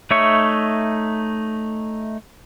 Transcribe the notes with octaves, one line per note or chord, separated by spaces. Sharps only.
A3 D#4 C#5 E5 C#6